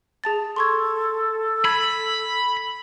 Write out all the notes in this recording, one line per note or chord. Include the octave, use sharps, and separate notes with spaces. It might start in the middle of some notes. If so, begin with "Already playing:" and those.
G#4 A5 A6
A4 C6 C#6 G#6
B5 G#6